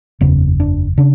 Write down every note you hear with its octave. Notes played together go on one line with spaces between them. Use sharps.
F#1 E2 C#3 B3
D4
C#3 D4